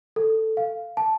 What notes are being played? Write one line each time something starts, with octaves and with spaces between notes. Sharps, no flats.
A4
F5
A5